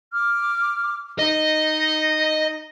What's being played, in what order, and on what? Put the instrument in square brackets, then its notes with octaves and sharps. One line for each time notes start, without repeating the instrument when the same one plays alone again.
[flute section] D6 F6
[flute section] D#4 [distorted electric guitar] D#5